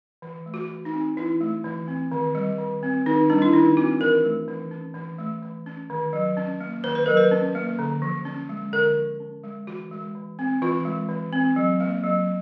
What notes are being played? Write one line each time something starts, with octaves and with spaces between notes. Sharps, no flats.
E3
A3
F#4
E3
D#4
C4
E3 E4
A3
E3
C4
D#3
G3
D#3
C4
D#3 D#4
G3 D4
E4
D#3 D#4
C4 F#4
E3 A#4
A3
E3
C#4
E3
A3
E3
C#4
D#3
F#3
C#4
A#3
D#3 C5
B4
F#3 A#4
B4
C#4
A#3
D3
F3
C#4
G#3
D3 A#4
F3
C#4
G#3
E3 F#4
G#3
E3
C4
E3 F4
G#3
E3
C4
F#3
A#3
F#3